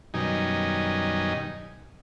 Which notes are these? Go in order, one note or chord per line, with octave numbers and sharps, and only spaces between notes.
F#2 B2 D#3 G3 D#4 G#5